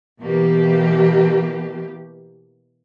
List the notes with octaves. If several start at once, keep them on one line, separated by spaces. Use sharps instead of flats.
B2 E3 A#3 G4